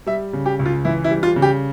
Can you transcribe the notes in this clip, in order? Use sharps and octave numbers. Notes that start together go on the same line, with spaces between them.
G3 E5
C#3
G4
C#2
F4
E3 E4
E4
G3
F4
C#3
G4